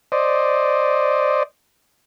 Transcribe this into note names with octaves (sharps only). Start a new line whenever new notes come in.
C5 D5 D#5